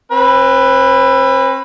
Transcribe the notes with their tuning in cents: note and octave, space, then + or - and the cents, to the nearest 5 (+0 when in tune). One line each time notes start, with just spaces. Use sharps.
C4 +40 B4 +0